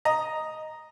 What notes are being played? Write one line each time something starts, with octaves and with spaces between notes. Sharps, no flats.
D#5 A#5